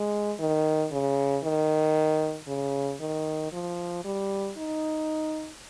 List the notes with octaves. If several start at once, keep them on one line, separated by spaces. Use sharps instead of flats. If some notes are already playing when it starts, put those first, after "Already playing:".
Already playing: G#3
D#3
C#3
D#3
C#3
D#3
F3
G3
D#4